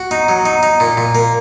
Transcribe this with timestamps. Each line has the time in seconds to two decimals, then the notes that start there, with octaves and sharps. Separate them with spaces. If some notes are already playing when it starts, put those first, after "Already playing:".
Already playing: F#4
0.11 D#4
0.28 F#3
0.45 D#4
0.63 D#4
0.80 A#2
0.97 A#2
1.15 A#3